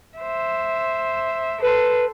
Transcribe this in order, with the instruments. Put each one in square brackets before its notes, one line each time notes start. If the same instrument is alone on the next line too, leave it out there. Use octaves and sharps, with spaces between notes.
[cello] C5 E5
[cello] A4 C5 [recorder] B4